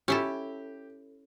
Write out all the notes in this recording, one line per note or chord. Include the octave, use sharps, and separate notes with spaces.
C#4 E4 G4 A4